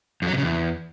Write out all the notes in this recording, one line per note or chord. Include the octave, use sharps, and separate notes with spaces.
F2
F#3
C3
C#3
E2